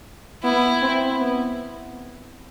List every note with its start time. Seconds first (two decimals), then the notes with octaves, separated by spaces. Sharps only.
0.43 B3 E4
0.83 C4
1.21 B3